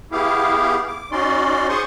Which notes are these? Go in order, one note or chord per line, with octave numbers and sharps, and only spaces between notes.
B3 E4 G4 G#4 F5
D6
C#4 D#4 F#4 D5 C6
G#4 C5 C6 C#6 D#6